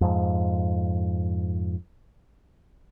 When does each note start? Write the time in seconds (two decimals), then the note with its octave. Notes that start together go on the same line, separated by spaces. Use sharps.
0.01 F2 G#2